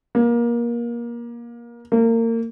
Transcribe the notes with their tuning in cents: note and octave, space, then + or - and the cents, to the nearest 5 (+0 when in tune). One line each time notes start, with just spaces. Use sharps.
A#3 +25
A#3 -30